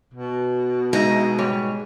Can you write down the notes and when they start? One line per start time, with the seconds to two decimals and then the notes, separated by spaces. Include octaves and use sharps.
0.14 B2
0.93 G#3 D#4 D#5 E5
1.38 G#2 G3 C#5